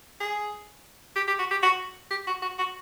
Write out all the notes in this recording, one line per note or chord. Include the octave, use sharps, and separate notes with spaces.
G#4
G4
G4
F#4
G4
F#4
G4
F#4
F#4
F#4